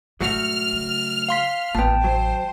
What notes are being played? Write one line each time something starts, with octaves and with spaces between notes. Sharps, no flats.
G#2 B2 F#3 A3 F#4 F6
C#3
F5 C6 B6
A1 A#2 D#3 B3 G5 A5
F#3 C5